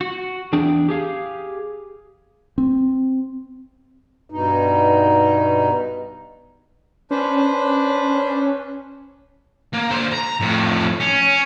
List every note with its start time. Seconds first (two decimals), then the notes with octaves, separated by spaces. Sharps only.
0.01 F#4
0.53 E2 D4 G#4 G5
0.89 G4 G#4 F5
2.58 C4
4.30 G2 B2 D#4
7.11 C#4 D4 B4 C5
9.73 A#3
9.90 D3 C5
10.12 A#5
10.40 F2 A2
11.00 C#4